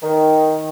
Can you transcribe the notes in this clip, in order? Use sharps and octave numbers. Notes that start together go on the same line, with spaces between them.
D#3